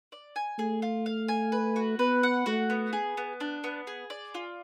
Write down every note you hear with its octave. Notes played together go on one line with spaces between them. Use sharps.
D5
G#5
A3 G#4
F4
F5
G#5
B4
F#4
B3 B4
F#5
A3 F#4
B3
G#4
B3
D4
B3
G#4
D5
F4